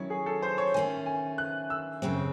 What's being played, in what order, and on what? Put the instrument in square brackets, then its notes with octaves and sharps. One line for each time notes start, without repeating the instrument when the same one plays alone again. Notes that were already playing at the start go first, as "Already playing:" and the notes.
Already playing: [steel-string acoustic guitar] D#3 F#3 C#4 E4 [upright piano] C#5
[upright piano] G#4
A4
C5
C#5
[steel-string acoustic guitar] D#3 A3 C#4 [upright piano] G#5
[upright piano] G#5
F#6
E6
[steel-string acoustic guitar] F#2 C#3 G#3 C4